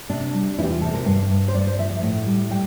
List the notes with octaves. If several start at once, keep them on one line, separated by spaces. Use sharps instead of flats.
C3 D4
G3
E2 E4
G4
F4
C3 A4
A#4
G2 F5
G2
C5
G2 D5
C5
F3 E5
F5
A2
G3
G3 G5